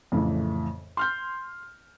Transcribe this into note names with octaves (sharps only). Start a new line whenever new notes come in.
F2 A2 C#3 E3
C6 F6 G6